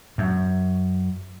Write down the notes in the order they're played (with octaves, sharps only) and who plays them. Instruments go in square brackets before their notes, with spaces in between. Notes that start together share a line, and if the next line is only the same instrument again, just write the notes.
[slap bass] F#2